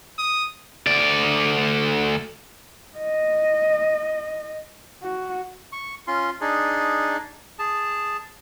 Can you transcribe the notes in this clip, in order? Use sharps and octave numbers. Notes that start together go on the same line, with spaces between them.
D#6
D2 D5
D#5
F#4
C#6
C#4 F4 C6
D4 D#4 G#4
G#4 A5